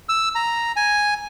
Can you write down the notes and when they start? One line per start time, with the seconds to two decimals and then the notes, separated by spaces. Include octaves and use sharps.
0.09 E6
0.35 A#5
0.76 G#5